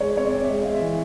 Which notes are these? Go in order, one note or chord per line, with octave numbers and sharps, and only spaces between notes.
G#3 C#5
C4 C#5
D5
C4
E5
G#3 D#5
C4 F5
E5
E3